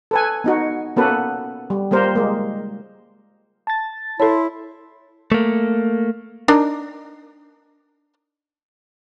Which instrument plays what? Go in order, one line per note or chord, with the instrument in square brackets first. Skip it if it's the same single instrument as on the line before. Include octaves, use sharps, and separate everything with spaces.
[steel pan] A4 B4 G#5
B3 D#4 F#4
A#3 B3 C#4 F#4 A4 B4
G3
G3 A#3 A#4 C5
G#3 A#3
[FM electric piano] A5 A6
[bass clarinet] E4 [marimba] A4 C#5 [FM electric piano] A5 C6
[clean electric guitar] A3 A#3
[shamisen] D4 D#4 A#4